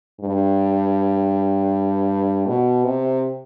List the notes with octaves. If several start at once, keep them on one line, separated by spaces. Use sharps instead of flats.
G2
B2
C3